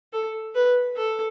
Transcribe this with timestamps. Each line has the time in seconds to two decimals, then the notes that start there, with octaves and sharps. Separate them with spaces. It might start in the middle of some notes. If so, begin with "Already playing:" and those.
0.13 A4
0.55 B4
0.96 A4